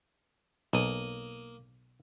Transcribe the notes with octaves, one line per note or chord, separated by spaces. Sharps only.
B1 A#3 D#6